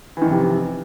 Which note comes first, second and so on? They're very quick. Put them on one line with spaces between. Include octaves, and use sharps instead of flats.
E3 D#3 F2 C3